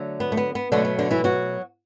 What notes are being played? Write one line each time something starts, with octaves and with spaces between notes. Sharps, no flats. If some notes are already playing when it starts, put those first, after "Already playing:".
Already playing: D3 F#3 A3
B3
A3
B3
B3
B2 D3 F#3 A3 D4
B3
D3 D4
E3 E4
F#3 F#4